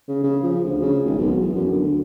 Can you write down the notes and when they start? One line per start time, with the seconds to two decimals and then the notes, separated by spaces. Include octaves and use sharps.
0.08 C#3
0.24 C#3
0.43 F3
0.64 D2
0.82 C#3
1.05 G#1
1.18 B1
1.41 E2
1.55 F#2
1.71 D3
1.83 D2